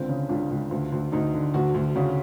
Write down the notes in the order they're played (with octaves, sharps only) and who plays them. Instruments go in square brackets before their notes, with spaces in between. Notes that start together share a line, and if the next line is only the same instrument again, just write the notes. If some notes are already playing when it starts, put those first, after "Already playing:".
Already playing: [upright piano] C#2 D3 C4
C#3
C#2 D4
C#2
D2
D2
D2 D#4
D3
D2 F#4
D2
C#3 F#4